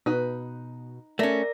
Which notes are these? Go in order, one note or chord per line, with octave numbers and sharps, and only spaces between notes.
B2 D#4 B4
A3 C#4 A#4 D5 A#6